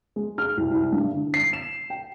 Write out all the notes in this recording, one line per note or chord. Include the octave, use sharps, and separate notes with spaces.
G#3
F6
C2
C2
G2
D3
C7
E7
G5